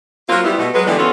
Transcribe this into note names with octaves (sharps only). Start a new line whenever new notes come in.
F#3 A#3 C4 F4
G3 B3 E4
B2 A3
F#3 G#3 B4
D3 E3 G3 G#3 B3 G4
E3 B3 C#4 F4 F#4 A4